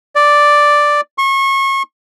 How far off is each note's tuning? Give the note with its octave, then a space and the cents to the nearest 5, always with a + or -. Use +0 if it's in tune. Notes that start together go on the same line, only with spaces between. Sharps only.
D5 +0
C#6 -30